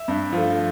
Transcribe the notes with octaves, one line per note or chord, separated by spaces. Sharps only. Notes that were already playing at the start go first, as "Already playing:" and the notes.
Already playing: E5
G2
F3 A3